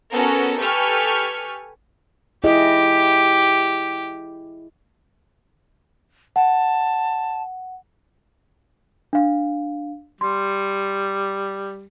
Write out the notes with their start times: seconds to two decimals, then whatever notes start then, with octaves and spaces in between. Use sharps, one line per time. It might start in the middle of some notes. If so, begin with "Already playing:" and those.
0.13 B3 C#4 F#4 A4 A#4
0.60 G4 A4 B4 G#5 C#6 F6
2.44 E4 G4 G#4 D#5
6.36 F#5 A5
9.13 D4 F5
10.21 G3 C6